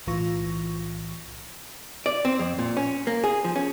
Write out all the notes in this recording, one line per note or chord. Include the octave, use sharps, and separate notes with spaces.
B1 A2 E3 F4 C#6 A#6
D5
C4
F2
A#2
C#4
A#3
G#4
F3
C#4